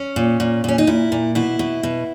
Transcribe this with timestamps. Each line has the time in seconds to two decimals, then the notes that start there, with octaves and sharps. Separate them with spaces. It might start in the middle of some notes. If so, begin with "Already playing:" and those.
Already playing: C#4
0.16 A#2
0.40 A#2
0.64 A#2 C#4
0.78 D#4
0.87 A#2 E4
1.12 A#2
1.35 B2 E4
1.59 B2
1.83 B2